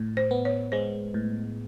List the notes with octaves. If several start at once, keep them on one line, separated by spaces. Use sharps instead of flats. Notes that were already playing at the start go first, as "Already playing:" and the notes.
Already playing: A2
C5
B3
C#5
G#3 C5
A2